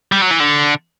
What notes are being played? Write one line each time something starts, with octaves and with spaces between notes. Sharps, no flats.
G3
F#3
E3
D3